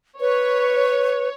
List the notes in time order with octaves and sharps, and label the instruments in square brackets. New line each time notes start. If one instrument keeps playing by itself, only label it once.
[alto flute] B4 [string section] C#5